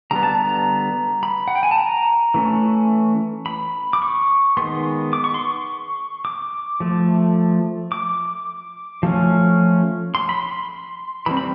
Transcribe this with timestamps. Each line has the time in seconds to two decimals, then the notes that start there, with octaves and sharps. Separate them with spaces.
0.11 D3 G3 B3 A#5
0.23 A5
0.35 A#5
1.23 B5
1.48 F#5
1.55 G5
1.63 G#5
1.71 A5
1.78 A#5
2.34 E3 A3 C#4
3.46 B5
3.93 D6
4.02 C#6
4.57 D#3 G#3 B3 C6
5.13 D6
5.24 C#6
5.34 C6
5.44 C#6
6.25 D6
6.80 F3 A3
7.92 D6
9.03 F3 A3 C#4
10.15 C6
10.29 B5
10.43 C6
11.26 E3 G3 C4 B5
11.37 B5